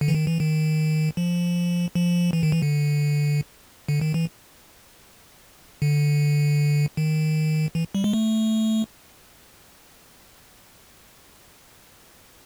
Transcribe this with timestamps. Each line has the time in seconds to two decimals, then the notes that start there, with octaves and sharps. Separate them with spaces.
0.01 D3
0.08 E3
0.15 D#3
0.27 E3
0.40 D#3
1.17 F3
1.95 F3
2.33 E3
2.43 D#3
2.52 E3
2.62 D3
3.88 D3
4.01 D#3
4.14 E3
5.82 D3
6.97 D#3
7.75 E3
7.95 G3
8.04 G#3
8.13 A3